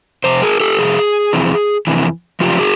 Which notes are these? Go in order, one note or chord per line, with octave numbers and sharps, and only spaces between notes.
F2 C3 C5
G#4 A#4
G4 A4
F2 C3 G#4
F2 C3 E3
F2 C3 E3
F#2 C#3 F3 F4 G4
F#4 G#4